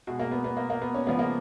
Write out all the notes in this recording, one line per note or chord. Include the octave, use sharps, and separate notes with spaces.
B2 G#3 F#4
A#3
B3
B3
A#3
A#3
B3
C#4
C#3 F3 G#3 B3
A#3